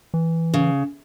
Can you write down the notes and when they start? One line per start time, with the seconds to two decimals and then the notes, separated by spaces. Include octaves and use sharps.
0.14 E3
0.54 C#3